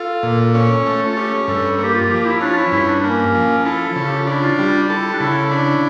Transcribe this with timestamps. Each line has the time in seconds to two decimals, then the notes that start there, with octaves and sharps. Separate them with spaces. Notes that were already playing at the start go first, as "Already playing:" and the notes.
Already playing: F4 A4
0.23 A#2
0.55 C#4
0.86 A3
1.06 F4
1.17 C#4 G4
1.48 G2 A4
1.79 A#3 G4
1.94 F4
2.10 F3 G4
2.25 E4
2.40 C#4 D4
2.49 F4
2.57 E4
2.72 G2 E4
2.87 D4
3.02 A#3 C#4
3.34 F3
3.65 E4 A4
3.86 E4
3.96 C#3
4.07 G4
4.18 F4
4.27 D4 E4
4.42 F4
4.59 G3
4.89 E4 A4
5.13 D4
5.20 C#3 E4
5.51 D4